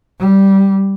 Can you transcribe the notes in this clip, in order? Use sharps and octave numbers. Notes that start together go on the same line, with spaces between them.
G3